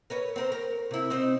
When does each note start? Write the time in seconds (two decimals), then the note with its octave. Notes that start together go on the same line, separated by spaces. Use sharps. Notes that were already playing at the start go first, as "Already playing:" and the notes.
0.10 A#4 B4 C#5
0.36 C4 A#4 C5
0.52 A#4
0.91 C3 E4
1.10 C4 D#4 C5